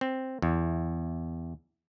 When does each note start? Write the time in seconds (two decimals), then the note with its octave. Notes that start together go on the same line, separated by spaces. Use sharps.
0.01 C4
0.42 E2